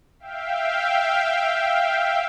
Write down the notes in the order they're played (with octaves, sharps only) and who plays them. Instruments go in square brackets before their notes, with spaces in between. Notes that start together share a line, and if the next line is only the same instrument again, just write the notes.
[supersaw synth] E5 F5 G5